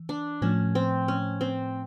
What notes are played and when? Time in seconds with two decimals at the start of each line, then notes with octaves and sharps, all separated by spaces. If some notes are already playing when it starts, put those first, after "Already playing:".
Already playing: E3
0.09 D4
0.42 A2 F3 A3 C#4
0.75 C4
1.08 C#4
1.41 C4